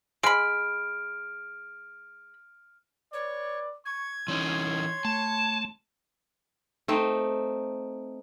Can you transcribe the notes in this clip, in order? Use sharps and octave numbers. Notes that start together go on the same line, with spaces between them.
G#3 B5 F6 D7
B4 C#5 D5
C#6 G#6
E3 C#4 D#4 C#5 C6
A3 A5
A3 C4 D#4